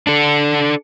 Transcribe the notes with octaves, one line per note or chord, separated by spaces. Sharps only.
D4 A4